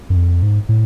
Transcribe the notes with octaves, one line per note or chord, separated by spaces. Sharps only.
F#2
F2
G#2
A2